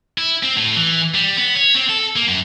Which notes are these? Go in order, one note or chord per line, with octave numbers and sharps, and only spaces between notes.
E4
C4
A2
E3
G3
B3
C#5
C4
A4
A#3
F#2